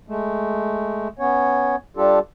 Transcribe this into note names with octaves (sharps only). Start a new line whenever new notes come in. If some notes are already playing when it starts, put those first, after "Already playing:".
G#3 A3
B3 C#4 C#5
G3 D4 F4 G4 A4